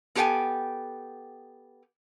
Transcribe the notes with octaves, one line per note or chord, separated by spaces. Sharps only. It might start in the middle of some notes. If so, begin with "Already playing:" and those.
B3 G4 A4 C5 G5 G#5